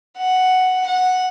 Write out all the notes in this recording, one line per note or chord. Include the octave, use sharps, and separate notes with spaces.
F#5
F#5